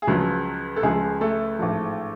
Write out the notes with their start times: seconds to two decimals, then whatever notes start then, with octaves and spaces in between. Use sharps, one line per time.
0.02 G#4
0.07 C#2 C#3 F3 F#3 F#4
0.76 A4
0.83 C#2 C#3 F3 G#3 G#4
1.21 A3 A4
1.59 A1 G#2 F3